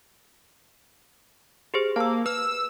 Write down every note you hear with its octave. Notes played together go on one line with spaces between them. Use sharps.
G4 G#4 C5
A#3 A5 E6
B4 E6 F6